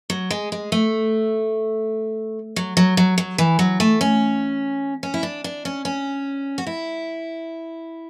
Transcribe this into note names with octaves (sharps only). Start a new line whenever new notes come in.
F#3
G#3
G#3
A3
F#3
F#3
F#3
F#3
E3
F#3
A3
C#4
C#4
E4
D4
D4
C#4
C#4
F#4
E4